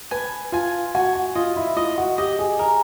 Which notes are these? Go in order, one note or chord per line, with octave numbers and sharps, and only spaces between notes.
B4 G#5
F4 G#5
F#4 G#5
F#4
F4 D#5
E4
F4 D#5
F#4
G4 D#5
G#4
G#4 A#4